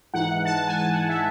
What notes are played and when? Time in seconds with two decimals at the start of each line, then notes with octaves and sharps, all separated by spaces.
0.14 G#2 E3 G#3 D#4 F#5
0.45 A5
0.67 G#5
0.77 A5
0.92 F#5
1.09 E5